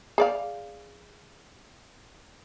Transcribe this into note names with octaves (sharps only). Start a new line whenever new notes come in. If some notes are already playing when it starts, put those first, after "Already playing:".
G#4 D5 F5